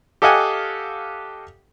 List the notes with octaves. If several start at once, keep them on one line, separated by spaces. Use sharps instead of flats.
G4 A4 D#5 F5 F#5 G#5